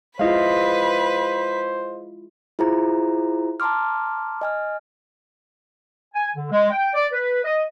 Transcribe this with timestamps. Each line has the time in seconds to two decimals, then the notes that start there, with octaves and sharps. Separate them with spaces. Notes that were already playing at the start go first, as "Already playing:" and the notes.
0.19 G#3 E4 F4 B4 C5 D#5 F5 B6
2.59 E4 F4 G#4 C5 A#5
3.60 A5 A#5 C6 D6 F6
4.41 D#5 G#5 F6
6.14 G#5
6.35 D3
6.51 G#3
6.70 G5
6.94 D5
7.12 B4
7.44 D#5